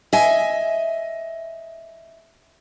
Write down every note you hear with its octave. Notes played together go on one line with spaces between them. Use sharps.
D#5 E5 G#5